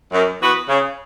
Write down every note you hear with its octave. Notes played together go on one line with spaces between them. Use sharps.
F#2
E3 B3 F#4 B4
C#3